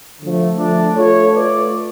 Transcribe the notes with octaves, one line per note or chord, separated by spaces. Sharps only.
D3 F3 A3
F3 A3 D4
A3 F4 A4 C#5
A3 F4 B4 D5